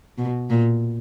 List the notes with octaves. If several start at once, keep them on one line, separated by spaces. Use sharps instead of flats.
B2
A#2